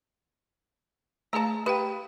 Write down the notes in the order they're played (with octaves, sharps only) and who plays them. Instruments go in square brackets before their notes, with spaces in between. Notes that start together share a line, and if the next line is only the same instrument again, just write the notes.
[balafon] A3 G#4 F5 [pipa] A5 A#5
[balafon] G4 F5 G5 [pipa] B4